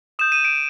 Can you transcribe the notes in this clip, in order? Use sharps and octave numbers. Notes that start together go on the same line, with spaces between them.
D#6 G6 E7
D#7
D7